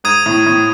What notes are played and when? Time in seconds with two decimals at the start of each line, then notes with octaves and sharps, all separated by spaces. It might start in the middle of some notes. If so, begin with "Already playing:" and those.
0.04 G#2 D#6 G#6 D#7
0.26 A2
0.46 A2